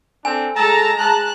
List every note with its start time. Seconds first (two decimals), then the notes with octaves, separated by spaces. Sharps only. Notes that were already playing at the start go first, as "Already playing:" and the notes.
0.25 C4 D4 A4 G#5
0.56 G#3 A4 A5 A#5
1.00 A5 F#6